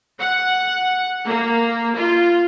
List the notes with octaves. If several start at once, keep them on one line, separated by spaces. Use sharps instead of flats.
F#5
A#3
F4